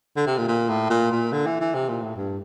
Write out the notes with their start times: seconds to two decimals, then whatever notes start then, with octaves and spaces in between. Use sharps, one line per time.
0.16 D3
0.26 C3
0.38 A#2
0.48 A#2
0.69 A2
0.90 A#2
1.12 A#2
1.32 D3
1.46 E3
1.60 E3
1.74 C3
1.89 A#2
2.02 A2
2.16 G2